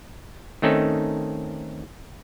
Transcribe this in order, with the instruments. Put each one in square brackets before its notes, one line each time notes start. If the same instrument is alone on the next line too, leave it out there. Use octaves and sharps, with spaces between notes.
[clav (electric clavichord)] D#3 A3 C4 C#4 D#4 A4